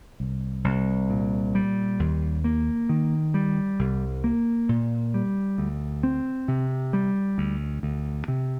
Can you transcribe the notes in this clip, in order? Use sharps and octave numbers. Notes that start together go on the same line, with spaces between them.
C2
C2
A#2
G3
D#2
A#3
D#3
G3
C2
A#3
A#2
G3
D2
C4
C3
G3
D2
D2
C3